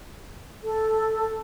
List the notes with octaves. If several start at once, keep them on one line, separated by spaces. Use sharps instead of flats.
A4